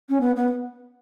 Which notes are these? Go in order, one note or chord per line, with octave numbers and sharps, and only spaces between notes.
C#4
B3
B3